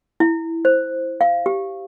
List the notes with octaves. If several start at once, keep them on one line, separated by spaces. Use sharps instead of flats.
E4
C5
F5
G4